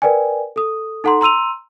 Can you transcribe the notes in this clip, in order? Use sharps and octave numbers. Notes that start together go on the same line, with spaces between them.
A#4 B4 D5 G5 G#5
A4 D#6
D#4 A4 F#5 A#5 C6
A#5 C6 E6 D#7 F7